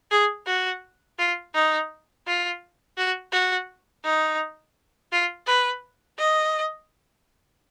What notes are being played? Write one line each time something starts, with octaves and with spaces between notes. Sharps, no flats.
G#4
F#4
F4
D#4
F4
F#4
F#4
D#4
F4
B4
D#5